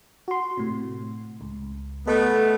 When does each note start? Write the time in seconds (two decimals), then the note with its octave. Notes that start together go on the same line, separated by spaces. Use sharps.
0.28 F#4 C6
0.57 A2 C3
1.41 C#2
2.07 A3 B3 A4 D#5 B5